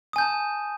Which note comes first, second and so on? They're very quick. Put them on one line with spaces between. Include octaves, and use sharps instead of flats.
D#6 G#5 G6 A5